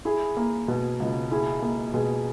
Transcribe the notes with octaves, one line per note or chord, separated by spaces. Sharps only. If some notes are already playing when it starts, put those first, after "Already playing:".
E4 G#4
A#3
B2
C#2
E4 G#4
A#3
B2 G#4